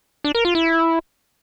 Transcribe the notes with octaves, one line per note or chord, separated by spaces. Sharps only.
D4
A#4
F4
E4